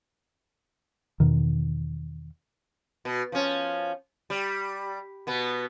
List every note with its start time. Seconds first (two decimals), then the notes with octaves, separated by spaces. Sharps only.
1.20 E2 B2 D#3
3.05 B2
3.32 F3 C#4
4.30 G3
5.27 B2 B3